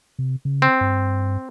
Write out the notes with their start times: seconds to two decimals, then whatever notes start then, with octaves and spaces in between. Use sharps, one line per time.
0.19 C3
0.45 C#3
0.62 C4
0.81 G2